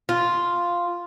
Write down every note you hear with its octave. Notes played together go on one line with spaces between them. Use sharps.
F4